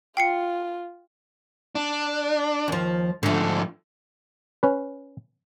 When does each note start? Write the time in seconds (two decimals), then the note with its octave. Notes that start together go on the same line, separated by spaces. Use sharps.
0.17 F4 G5 C7 C#7
1.75 D4
2.68 D#2 F3
3.23 G#2 D3 F3 A3
4.63 C#4 B4